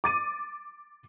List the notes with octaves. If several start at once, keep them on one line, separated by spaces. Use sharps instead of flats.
D6 A6 D#7